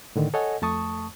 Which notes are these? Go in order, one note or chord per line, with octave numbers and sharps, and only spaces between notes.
A2 D3 D#3
A4 C#5 D#5 F#5 G#5
F2 A3 A5 C#6 D#6